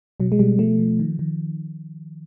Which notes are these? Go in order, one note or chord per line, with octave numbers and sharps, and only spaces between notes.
B2 F#3
G#3
B2 G3
F3 A3
F3
D#3
D#3